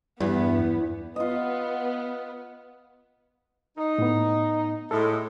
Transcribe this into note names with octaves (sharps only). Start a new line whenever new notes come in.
E2 G2 B3
B3 F4 D#5
D#4
A2 B3
A2 G#3 A4